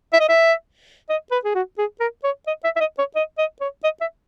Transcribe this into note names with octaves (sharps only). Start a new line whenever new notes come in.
E5
D#5
E5
D#5
B4
G#4
F#4
G#4
A#4
C#5
D#5
E5
E5
D#5
C#5
D#5
D#5
C#5
D#5
E5